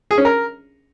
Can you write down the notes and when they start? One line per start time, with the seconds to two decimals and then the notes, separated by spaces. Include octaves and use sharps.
0.11 G#4
0.18 C#4
0.25 A#4